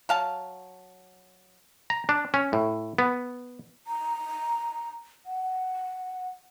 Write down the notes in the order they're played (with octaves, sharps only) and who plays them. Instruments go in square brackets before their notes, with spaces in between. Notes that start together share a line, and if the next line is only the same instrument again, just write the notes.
[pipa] F#3 F5 A5
[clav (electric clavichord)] A#5
D4
C#4
A2
B3
[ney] A#5
F#5